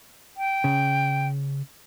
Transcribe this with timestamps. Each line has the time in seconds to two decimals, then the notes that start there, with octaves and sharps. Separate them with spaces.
0.37 G5
0.64 C#3